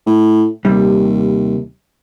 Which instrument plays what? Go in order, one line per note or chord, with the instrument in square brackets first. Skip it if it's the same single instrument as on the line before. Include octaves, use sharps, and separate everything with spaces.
[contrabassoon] A2
[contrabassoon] D#2 [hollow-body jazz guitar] C3 G3